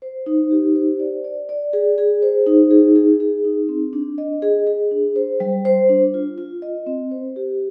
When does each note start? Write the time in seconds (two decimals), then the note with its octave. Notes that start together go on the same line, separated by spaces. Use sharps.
0.02 C5
0.26 D#4
0.51 G4
0.75 C5
1.00 D5
1.24 D5
1.49 D5
1.73 G#4
1.98 G#4
2.22 C5
2.47 D#4
2.71 G#4
2.96 G#4
3.20 G#4
3.44 D#4
3.69 C4
3.93 D4
4.18 D#5
4.42 G#4
4.67 G#4
4.91 D4
5.16 C5
5.40 G3
5.65 C5
5.89 D4
6.14 F4
6.38 F4
6.62 D#5
6.86 C4
7.11 C5
7.36 G4